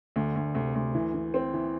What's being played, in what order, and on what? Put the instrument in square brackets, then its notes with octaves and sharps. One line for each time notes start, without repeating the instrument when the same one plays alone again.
[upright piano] D2 [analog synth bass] D3
[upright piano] D2
[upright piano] D2 [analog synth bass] C3
[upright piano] D2
E3
E3
C4
E3